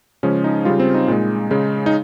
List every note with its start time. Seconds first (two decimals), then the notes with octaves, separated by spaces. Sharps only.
0.23 C#3 F3 G#3 C#4
0.44 D#4
0.65 C#3 G3 F4
0.80 C4
0.94 D#4
1.08 A#2 G#3
1.51 C#3 G#3
1.86 D#4